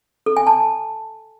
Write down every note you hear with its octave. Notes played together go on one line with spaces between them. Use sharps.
A4
G#5
A5